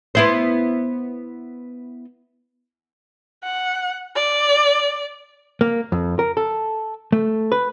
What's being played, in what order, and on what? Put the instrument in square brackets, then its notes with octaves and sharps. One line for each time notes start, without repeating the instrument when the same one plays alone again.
[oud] B3 E4 C5
[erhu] F#5
D5
[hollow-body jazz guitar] A#3
F2
A#4
A4
A3
B4